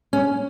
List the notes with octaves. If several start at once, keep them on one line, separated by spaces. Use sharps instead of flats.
C#4